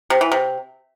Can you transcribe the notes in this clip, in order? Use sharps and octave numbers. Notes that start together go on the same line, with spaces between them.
C3
E3
C3